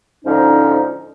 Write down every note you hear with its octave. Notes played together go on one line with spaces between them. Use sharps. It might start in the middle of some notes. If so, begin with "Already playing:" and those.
G#2 D3 F3 C#4 D#4